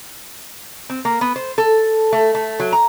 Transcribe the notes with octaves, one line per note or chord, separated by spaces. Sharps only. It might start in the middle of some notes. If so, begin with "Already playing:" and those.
C4
A#3
B3
C5
A4
A3
A3
F#3
A#5